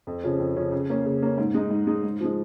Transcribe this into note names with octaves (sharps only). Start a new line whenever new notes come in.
F2
C#3 F3 C#4
F2
C#3 F3 C#4
C#3
A#3 C#4
C#3
A#3 C#4
G#2
G#3 D#4
G#2
G#3 D#4
G#2
F3 G#3